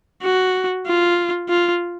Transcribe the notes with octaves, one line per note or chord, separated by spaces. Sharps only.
F#4
F4
F4